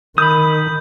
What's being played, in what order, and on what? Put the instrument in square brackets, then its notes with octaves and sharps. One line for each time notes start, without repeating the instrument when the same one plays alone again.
[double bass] D#3 [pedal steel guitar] B5 D#6 [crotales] G6